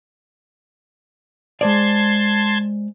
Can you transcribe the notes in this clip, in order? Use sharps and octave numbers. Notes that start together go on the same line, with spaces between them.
G#3 C5 D5 A5 C6 G#6